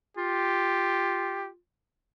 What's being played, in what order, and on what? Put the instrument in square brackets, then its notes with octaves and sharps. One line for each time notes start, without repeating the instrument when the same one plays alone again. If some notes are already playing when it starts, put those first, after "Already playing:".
[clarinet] F4 [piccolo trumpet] G4